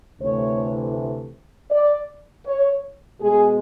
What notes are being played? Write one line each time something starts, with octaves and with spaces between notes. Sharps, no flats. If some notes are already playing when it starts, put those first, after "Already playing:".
D2 C3 E3 A3 C#5
D5
C#5
B2 G#3 G#4